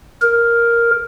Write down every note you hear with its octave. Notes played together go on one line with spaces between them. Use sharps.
A#4